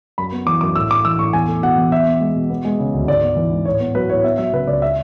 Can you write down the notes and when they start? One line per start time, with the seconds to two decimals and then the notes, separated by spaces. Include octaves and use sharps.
0.18 F#2 B5
0.32 B3
0.46 E3 D6
0.61 F#2 D6
0.76 A2 E6
0.91 A3 D6
1.05 E3 E6
1.19 A2 C#6
1.33 E2 G#5
1.48 A3
1.63 B2 F#5
1.77 E2
1.92 B2 E5
2.07 B3
2.20 G#3
2.35 B2
2.50 B3
2.65 G#3
2.79 C#3
2.94 D2
3.07 G#2 D5
3.22 B3
3.36 E3
3.51 G#2
3.65 A2 C#5
3.80 B3
3.95 F#3 B4
4.09 A2 C#5
4.24 B3 E5
4.38 F#3 E5
4.53 C#3 B4
4.68 C#2 D5
4.82 E5